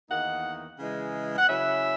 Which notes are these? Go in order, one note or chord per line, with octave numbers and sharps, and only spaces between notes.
E2 D#3 A#3 D#4 F#5
C#3 E3 G#3
F#5
C#3 F#3 C#4 E4 E5